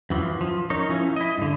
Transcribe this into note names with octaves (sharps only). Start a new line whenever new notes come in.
F#2 E3 F3
F3
C#4 D#4 A#4 C#5
F3 C#4 E4
E4 D#5
G2 D3